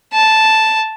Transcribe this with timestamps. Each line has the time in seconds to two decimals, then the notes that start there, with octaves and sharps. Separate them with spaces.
0.13 A5